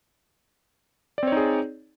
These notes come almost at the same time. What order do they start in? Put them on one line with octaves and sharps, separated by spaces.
D5 C4 C#5 D#4 G#4